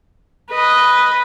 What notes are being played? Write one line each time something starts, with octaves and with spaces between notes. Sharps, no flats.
B4 D#5